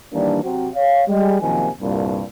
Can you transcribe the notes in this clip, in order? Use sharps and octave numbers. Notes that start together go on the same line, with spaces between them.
D#3 E3 G3 A#3 D4
C3 F#3 C4
C#5 F5
G3 G#3
F#2 C3 D#3 F3 A#3 G#5
C2 G2 A#2